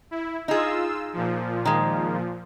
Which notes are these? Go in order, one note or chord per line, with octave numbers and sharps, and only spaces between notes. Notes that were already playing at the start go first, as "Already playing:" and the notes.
E4
D#4 F4 G#4 E6
A#2 F3
D#3 G#3